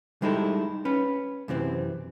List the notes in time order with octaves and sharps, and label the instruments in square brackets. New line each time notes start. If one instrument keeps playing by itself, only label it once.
[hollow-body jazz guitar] G3 G#3 D#4 E4 A4
C#4 B4
F#2 C3 E3 C4